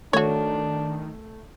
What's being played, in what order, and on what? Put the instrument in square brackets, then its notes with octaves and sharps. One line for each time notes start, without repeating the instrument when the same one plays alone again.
[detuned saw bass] D#3 [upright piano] A3 [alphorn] D4 [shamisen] F#4 C#5